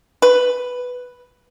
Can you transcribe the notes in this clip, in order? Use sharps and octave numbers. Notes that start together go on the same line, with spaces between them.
B4